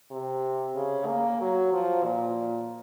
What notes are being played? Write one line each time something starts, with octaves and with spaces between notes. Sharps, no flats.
C3
C#3
A#3
F#3
F3
A#2